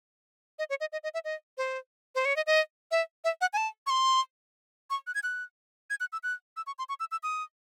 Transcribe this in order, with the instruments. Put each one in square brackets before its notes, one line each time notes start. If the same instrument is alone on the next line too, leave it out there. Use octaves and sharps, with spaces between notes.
[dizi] D#5
C#5
D#5
D#5
D#5
E5
D#5
C5
C5
C#5
D#5
D#5
E5
E5
F#5
G#5
A5
C#6
C6
C#6
F#6
G#6
F#6
G#6
F#6
E6
F#6
E6
C#6
C6
C#6
E6
E6
D#6